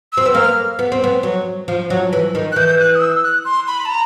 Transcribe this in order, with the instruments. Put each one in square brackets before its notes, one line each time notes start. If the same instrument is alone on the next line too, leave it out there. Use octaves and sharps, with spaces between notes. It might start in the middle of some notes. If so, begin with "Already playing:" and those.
[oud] C4 [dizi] E6
[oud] B3
[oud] A#3 [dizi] F6
[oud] B3
C4
B3
F#3
F3
F#3
E3
D#3
[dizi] F#6
[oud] E3 [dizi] G6
[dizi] G6
F#6
D#6
E6
F#6
C6
B5
A5
A#5